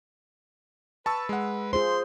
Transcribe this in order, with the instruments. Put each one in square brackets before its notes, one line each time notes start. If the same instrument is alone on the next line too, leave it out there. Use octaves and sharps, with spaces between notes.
[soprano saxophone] B4 [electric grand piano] A5 C#6 E6
[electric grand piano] G#3 F#5
[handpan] F4 G#4 C5 [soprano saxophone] C6